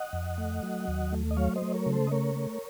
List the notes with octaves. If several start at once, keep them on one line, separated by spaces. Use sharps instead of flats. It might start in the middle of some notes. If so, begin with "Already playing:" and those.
Already playing: D#5 F#5
F2
A3
F#3
D#2
A3
D#5
F#3 C#5 F5
C5 D#5
A3
A#4 C#5
C#3
A4 C5
D#5
A3 A#4 C#5
A3